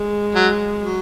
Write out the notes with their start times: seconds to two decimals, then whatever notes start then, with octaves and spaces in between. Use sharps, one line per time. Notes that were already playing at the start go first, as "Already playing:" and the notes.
Already playing: G#3
0.35 F#3
0.80 F#3